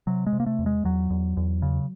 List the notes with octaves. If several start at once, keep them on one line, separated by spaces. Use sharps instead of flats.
C3 F#3
G#3
C3
A#3
A3
E2
G#3
E2 F#3
E2
E2
C#3